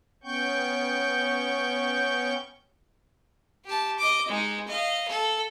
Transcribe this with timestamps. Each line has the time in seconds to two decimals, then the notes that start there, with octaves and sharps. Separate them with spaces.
0.23 B3 C#4 G5 C#6 G6
3.65 G4 A5
3.99 D#5 D6
4.28 G#3 D#4
4.68 D#5 F5
5.08 A4